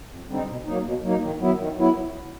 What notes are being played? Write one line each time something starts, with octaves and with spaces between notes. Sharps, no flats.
F2
D3 G3 C4 D#4
B2
F#3 A#3 D#4
B2
F#3 A#3 D#4
D#3
F#3 B3 E4
D#3
F#3 B3 E4